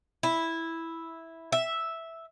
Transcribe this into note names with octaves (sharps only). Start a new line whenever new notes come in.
E4
E5